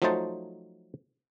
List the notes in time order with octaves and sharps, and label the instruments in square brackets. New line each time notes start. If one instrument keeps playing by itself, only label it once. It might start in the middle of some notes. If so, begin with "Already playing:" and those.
[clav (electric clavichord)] F3 F#3 A3 D#4 C5 A5